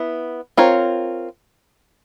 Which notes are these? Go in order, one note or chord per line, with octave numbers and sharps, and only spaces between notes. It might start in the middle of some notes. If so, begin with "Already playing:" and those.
Already playing: B3 E4
C4 F4 A#4 C#5